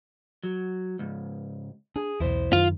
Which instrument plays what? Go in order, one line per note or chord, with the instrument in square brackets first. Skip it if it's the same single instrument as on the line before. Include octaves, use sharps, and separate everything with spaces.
[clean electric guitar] F#3
C#2 G#2
[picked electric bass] D4 [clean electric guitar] G#4
[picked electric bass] B1 E2 [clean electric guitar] E4 C5
[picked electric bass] F#2 D#3 [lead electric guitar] F4